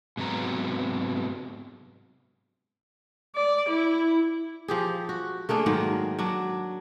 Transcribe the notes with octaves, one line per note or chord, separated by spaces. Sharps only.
G#2 C3 F#3 B3 A#5
D5
E4
F3 G4 G#4
F#4
A3 A#3 D4 G#4
G#2 D#3 F#3 A#3
F#3 D4